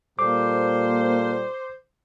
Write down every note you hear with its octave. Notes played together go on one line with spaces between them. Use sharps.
A#2 G3 A#3 A4 C5 D6